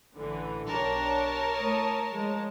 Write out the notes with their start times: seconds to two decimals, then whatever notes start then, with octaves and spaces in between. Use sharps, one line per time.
0.16 A1 D3 E3
0.69 B1 D4 G4 A#4 C#5 A5
1.57 A3 E4 D#6
2.11 F3 G#3